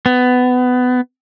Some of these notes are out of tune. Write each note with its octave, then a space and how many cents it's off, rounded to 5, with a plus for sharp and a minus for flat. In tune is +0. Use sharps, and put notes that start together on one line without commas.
B3 +20